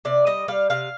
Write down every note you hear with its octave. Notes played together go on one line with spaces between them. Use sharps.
C3 D5
G3 D#5
G3 F5
C3 F5